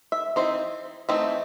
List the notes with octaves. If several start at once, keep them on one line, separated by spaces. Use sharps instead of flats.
E5
E3 A3 C4 D#4 C5
E3 A3 C4 D#4